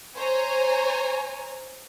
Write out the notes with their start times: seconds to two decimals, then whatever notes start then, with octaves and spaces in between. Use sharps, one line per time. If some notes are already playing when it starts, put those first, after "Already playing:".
0.17 C5 C#5 G#5 A#5